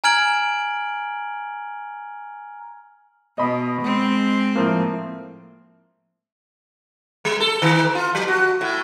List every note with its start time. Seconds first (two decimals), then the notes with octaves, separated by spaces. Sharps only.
0.04 G#5 A#5 F6 G#6 D7 F#7
3.38 B2 D#5 B5 D#6
3.82 G#3 C4
4.56 A2 F3 A#3
7.25 G3
7.40 A4
7.62 D#3
7.95 F4
8.15 F#3
8.28 F#4
8.61 A2